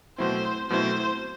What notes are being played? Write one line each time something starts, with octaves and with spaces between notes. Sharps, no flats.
B2 F#3 A3 C4 E4 C5
B2 F#3 A3 C4 E4 C5